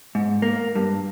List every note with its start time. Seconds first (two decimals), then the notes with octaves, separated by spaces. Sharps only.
0.15 G#2
0.42 A#3
0.75 G2